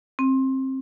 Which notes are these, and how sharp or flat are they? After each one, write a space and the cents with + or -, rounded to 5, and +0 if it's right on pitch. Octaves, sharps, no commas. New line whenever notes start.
C4 +20